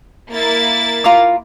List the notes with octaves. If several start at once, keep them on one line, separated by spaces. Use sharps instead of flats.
A#3 E4 A6
F4 A#4 D6